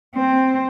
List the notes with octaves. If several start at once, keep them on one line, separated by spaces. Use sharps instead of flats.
C4